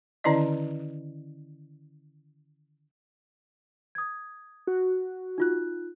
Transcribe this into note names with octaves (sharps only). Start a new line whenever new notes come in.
D3 D#3 C#4 E4 D5 D#5
D#6 G#6
F#4
D#4 F4 F#6